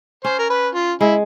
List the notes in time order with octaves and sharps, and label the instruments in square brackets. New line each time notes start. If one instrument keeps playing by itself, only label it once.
[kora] C#4 [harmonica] C5
[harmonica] A#4
B4
F4
[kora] G#3 [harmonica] E4